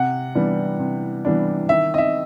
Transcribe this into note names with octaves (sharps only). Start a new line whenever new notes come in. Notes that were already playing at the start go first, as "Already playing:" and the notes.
Already playing: C3 F#5
E3 G3 B3 D4
C3
E3 G3 B3 D4
D#3 E5
D#5
E5